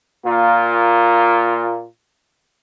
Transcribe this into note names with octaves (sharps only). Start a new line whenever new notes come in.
A#2 A#3 F4